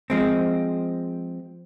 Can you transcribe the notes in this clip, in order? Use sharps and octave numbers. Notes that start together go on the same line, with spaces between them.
F3 G#3 C4